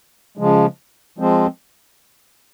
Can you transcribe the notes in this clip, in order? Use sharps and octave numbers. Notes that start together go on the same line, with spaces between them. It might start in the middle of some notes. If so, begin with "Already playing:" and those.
C#3 F3 G#3
F3 G#3 C4